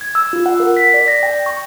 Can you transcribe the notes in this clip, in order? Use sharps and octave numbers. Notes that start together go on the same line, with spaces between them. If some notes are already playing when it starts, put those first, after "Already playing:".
G#6
E6
F4
F#5
A#4
B6
D5
A#6
G5
C#6